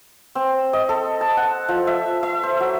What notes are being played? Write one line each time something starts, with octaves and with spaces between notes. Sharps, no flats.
C4
D#5
A4
A5
F#5
F3
E5
E5
C5
F#3